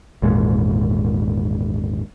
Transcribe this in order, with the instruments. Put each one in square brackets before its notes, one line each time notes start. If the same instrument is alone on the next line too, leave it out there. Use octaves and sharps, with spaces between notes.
[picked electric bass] G#1 E2 A#2 G#3